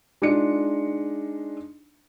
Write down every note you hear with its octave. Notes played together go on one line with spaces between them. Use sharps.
G#3 D4 D#4 F4 C#7